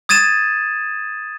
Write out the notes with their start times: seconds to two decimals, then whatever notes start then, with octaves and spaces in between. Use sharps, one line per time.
0.09 D#6 G#6 A6 D#7 E7